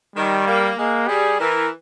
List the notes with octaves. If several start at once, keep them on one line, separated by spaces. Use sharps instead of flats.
D#3 G3
A#3
G#3 A#3
G3 G#4
E3 A#4